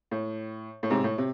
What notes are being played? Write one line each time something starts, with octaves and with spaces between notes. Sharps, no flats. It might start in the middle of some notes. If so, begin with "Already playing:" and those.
A2
A2
G#2 C3
A2
C3